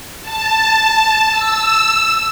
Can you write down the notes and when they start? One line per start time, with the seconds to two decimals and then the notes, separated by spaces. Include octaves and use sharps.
0.22 A5
1.31 E6